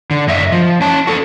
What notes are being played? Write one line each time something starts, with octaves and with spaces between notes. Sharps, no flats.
D3
F#2 D#5 E5
F3
C#4 A5
F#4 A4